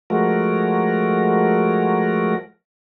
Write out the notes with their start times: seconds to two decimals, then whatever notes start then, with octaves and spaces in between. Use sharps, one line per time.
0.10 F3 G#3 A3 F#4 A#4